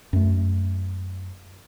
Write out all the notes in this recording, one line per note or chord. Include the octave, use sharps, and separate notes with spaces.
F#2 A3